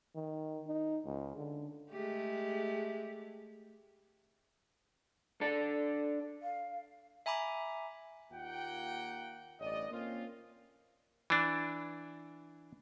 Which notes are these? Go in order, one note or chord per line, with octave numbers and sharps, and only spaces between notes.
D#3
D#4
C#2
D3
G#3 A3 G4
D4 A4
F5
E5 G#5 A#5 B5 D6
D#2 A#3 F4 F#5 G5
A1 G2 D5 D#5
A#3 C4 C#4 F4
E3 D4